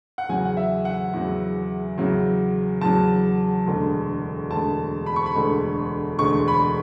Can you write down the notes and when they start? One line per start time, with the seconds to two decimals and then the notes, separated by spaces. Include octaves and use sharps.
0.18 F#5
0.29 E2 C#3 F#3 G#5
0.45 F#5
0.57 E5
0.85 F#5
1.13 E2 C#3 F#3
1.98 E2 C#3 F#3
2.81 E2 C#3 F#3 A5
3.66 E1 D2 D3 G#3
4.50 E1 D2 D3 G#3 A5
5.06 B5
5.16 C#6
5.26 B5
5.35 E1 D2 D3 G#3
6.19 E1 D2 D3 G#3 C#6
6.48 B5